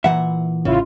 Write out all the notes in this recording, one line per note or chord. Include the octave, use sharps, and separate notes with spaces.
A#2 E3 E5 F#5
A1 C#3 E4 F4